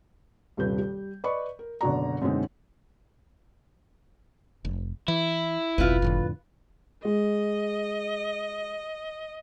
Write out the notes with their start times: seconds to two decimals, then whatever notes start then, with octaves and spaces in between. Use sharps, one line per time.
0.57 D#1 G2 C3 B4 G6
0.79 G3
1.24 B4 D5 D#5 B5 C#6
1.59 A#4
1.81 F#1 B2 D3 F#4 D5 A#5
2.22 F#2 B2 D3 G#3 C4 D#4
4.65 F1
5.08 E3 E4
5.78 F#1 B1 F2 B2 F4 B4
6.02 F2 A2 D3
7.05 G#3 D#5